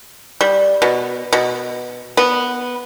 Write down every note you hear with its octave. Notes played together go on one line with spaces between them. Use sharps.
G3
B2
B2
B3